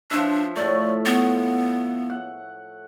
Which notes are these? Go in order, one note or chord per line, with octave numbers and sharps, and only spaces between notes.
F3 D4 F4 E5
A2 A3 D5
B3
F#5